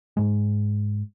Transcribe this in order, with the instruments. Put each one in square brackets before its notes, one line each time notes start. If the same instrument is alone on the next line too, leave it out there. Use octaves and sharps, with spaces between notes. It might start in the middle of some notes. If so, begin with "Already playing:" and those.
[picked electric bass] G#2 G#3